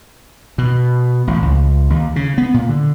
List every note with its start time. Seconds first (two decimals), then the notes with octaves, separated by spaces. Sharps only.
0.58 B2
1.27 A1
1.42 C#2
1.90 D#2
2.16 C#3
2.38 B3
2.54 A#2
2.69 D3